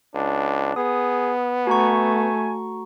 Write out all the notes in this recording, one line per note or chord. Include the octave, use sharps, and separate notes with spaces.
C#2 D4
B3 G#4 D#6
A3 F#4 G#5 A#5 C#6